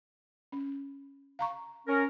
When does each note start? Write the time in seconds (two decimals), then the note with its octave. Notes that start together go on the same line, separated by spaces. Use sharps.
0.52 C#4
1.39 F5 A#5 C#6
1.87 C#4 A#4